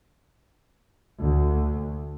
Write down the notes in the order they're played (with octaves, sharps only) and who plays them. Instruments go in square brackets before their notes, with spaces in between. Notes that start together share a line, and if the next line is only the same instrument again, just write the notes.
[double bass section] D2